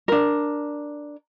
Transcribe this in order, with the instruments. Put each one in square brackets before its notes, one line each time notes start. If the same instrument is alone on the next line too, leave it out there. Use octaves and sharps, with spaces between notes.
[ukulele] D4 A#4